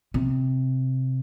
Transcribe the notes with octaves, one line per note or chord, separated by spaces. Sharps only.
C3